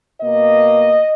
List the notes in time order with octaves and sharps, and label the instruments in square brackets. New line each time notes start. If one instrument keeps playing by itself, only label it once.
[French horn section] B2 A#3 D#5